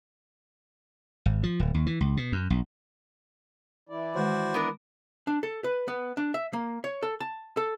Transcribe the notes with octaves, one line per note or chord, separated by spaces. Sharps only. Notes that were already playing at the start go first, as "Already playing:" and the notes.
G#1
F3
D1
D#2
E3
C#2
B2
F#2
B1
E3 E4 D5
D#3 G#3 F#4 B4 C5
B3 D4 A#4
D4
A4
B4
B3
D4
E5
A#3
C#5
A4
A5
A4